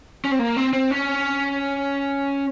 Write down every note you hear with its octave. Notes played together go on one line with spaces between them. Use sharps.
C#4
C4
A#3
C4
C4
C#4